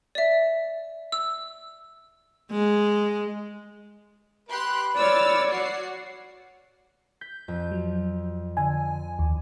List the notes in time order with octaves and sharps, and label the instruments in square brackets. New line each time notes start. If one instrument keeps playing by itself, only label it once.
[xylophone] D5 E5
E6
[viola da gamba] G#3
[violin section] G4 C6 F#6 [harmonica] B4
[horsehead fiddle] C#5 D5 [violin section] E6 F6 A6
[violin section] F#4 F#5 C7
[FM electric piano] G6 [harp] B6
[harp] F2
[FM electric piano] F#3
[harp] D3 [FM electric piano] G#5
[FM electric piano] D#2